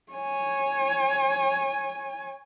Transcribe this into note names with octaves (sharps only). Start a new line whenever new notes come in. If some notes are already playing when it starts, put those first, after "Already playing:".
C#5 G#5